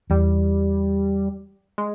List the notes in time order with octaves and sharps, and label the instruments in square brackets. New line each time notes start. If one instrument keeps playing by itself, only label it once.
[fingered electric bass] E2 [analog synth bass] G3
[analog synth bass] G#3